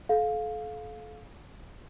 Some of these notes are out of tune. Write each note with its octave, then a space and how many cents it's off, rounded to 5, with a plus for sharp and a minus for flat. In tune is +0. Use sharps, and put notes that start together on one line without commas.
A4 -35 F5 +15